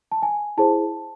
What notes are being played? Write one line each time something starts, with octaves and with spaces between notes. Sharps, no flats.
A5
G#5
E4 G#4 C5 A5